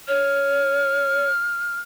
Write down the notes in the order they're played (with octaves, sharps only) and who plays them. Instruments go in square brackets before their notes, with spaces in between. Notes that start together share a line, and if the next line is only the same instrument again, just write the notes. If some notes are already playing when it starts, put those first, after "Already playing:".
[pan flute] C#5 [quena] F6